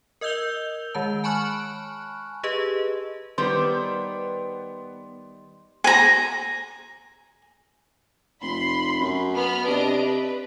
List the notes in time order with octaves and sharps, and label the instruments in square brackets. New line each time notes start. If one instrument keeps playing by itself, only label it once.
[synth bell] A#4 D#5 E6 G6 F7 G7
D#3 G#3 A5
G#5 A5 B5 C#6 F6 F#6
G4 G#4 B4 D#5
[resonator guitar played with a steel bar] D#3 G3 C5 [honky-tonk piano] B3 [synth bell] C6
[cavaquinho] G#5 A#5
[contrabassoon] F1 [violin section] B5 C6
[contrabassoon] F#2
[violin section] B3 B5 F6
[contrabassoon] C3 [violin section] D4 D#5 D7
[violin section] B4